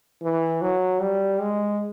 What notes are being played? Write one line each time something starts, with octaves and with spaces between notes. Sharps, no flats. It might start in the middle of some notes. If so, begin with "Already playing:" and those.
E3
F#3
G3
G#3